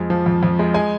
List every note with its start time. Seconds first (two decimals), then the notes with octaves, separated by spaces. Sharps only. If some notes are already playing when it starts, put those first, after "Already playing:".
Already playing: F2 G#3
0.10 F3
0.26 F2
0.43 F2
0.59 G#3
0.74 G#3 G#5